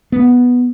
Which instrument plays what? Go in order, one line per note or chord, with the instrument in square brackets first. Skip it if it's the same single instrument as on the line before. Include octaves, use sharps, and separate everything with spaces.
[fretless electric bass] B3